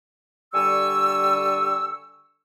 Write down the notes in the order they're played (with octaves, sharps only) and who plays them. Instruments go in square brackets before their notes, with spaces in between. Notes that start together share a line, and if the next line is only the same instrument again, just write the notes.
[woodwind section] D3 G3 G#5 C#6 E6